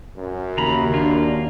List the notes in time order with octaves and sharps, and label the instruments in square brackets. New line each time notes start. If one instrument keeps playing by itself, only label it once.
[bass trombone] F#2
[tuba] D#2 [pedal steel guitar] C#3 A#5 B5
[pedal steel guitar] A#3 F4 [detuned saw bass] D4